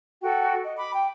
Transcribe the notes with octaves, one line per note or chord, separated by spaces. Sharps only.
F#4 A4 G5
D#5
B5 D6
G5